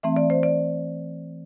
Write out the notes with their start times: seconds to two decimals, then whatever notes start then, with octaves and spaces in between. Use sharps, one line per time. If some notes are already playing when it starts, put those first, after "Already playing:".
0.03 E3 A3 C4 E5
0.17 D5
0.30 C5
0.43 D5